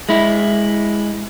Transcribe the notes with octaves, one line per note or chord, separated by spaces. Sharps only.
G#3 E4